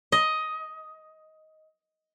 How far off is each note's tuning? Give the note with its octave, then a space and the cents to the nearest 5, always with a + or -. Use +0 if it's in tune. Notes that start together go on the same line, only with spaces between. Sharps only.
D#5 +10